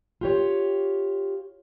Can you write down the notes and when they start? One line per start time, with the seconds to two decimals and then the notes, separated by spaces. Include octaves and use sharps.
0.21 F4 G4 C#5